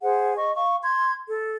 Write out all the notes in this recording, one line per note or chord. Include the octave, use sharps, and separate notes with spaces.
G#4 C5 F#5
D#5 C#6
F5 C#6
C6 G#6
A4